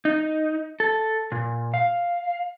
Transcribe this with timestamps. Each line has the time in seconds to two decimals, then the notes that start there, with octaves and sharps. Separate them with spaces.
0.05 D#4
0.80 A4
1.32 A#2
1.74 F5